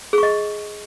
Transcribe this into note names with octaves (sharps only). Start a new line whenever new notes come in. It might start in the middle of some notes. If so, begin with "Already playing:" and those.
G#4 D#5 C#6